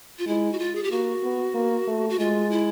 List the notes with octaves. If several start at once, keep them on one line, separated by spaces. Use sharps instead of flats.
F4
G#3 E4
F#4
F4
G#4
G4
A#3 F#4
B3
A#3
A3
F#4
G#3 F4
E4